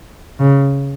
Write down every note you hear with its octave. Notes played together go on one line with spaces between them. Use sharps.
C#3